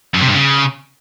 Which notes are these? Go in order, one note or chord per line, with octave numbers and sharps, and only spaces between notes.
F#2
C3
G2
C#3